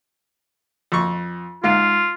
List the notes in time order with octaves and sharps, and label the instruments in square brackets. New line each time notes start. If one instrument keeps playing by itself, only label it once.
[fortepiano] F2 C#6
[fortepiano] G#2 F5 [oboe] F4